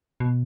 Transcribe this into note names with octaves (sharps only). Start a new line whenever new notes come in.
B2